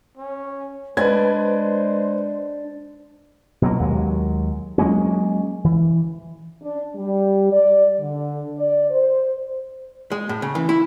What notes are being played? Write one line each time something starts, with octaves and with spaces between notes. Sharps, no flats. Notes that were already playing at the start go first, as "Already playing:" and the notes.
C#4
G#3 D4 B4 C5 G#6
B2 F#3 A#3
D#2 F#3 G#3
F#3 G#3 A#3 C#4
E3
D4
G3
D5
D3
D5
C5
G#3
A2
C#3
E3
E4